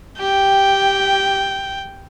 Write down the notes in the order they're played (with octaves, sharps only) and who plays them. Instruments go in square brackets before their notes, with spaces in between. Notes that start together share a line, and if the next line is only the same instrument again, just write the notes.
[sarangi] G4 [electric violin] G5